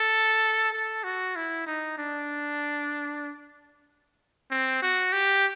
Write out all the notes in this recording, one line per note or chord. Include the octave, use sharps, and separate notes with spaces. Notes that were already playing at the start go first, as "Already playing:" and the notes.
Already playing: A4
A4
F#4
E4
D#4
D4
C4
F#4
G4